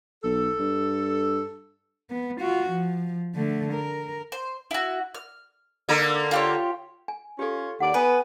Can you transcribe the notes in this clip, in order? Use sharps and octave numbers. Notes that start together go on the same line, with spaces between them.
B1 A4
G2
B3
F4 F#4
F3
D3 A3
A#4
C5
E4 F#4
F6
D3 A#3 A#4
F4 G4 C#5
G#5
C#4 F4 G4 A4 C#5
D#2 D5 F#5
B3 B4 G#5